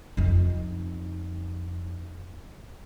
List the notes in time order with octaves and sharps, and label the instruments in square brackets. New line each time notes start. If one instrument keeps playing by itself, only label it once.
[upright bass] F2 D#4